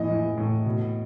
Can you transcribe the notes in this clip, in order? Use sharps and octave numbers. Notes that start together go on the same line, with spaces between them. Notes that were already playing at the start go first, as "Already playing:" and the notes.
Already playing: A2 E3 D#5
E3
A2
B2